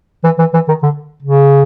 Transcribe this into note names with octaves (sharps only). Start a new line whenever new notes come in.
E3
E3
E3
D#3
D3
C#3